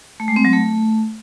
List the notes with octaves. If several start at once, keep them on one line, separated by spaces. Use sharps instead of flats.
A3
G#3
C4
F#3
A3